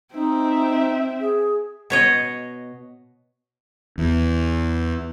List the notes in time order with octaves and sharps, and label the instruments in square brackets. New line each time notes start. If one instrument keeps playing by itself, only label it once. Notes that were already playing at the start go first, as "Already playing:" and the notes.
[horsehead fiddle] C4 E5 [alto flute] D#4
[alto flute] G#4
[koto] B2 C#5 D#5
[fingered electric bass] E2